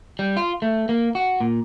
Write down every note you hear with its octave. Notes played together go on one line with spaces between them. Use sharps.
G3
F4
A3
A#3
F#4
A#2